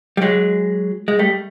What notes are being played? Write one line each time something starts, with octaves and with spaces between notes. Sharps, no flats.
G3
F#3 G#3
G#3
G3 A3